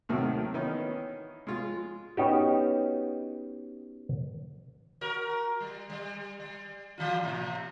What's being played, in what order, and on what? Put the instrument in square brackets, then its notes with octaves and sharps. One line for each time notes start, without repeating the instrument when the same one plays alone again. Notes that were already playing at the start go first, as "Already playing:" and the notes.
[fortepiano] D#2 A2 C3 D#3 F#3 C4
D#3 E3 B3 C#4 D#4
G#3 F4
[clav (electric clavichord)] B3 C#4 D#4 F#4 G4
[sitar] F#4 A#4
G3
G3
G3
E3 G3 F4
A2 C3